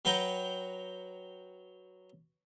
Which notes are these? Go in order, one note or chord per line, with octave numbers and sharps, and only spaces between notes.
F#3 B4 F#5 G5 A#5